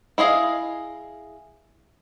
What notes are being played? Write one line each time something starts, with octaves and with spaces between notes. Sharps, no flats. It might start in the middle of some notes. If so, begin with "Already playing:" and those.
E4 G#4 D#5 F5